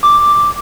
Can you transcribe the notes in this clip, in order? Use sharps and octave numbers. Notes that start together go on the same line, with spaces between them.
D6